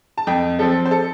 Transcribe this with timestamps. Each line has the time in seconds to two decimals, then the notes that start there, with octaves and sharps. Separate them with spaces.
0.17 A5
0.27 F2 G5
0.59 F3 C4 A4
0.85 C5
0.91 A4